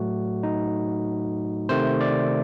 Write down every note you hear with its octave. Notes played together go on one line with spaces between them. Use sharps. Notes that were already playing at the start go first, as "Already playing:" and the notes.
Already playing: A2 F#3 A3 F#4
D#4
C3 D#3 A3 C5
D5